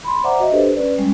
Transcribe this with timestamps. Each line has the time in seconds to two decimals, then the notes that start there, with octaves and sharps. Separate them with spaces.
0.04 B5 C6
0.24 C5 D5 E5 F#5 A#5 D6
0.40 F#4 D#5 E5
0.52 D4 G4 A4 B4 C5
0.76 C#4 B4 D5
0.98 G3 G#3 C#4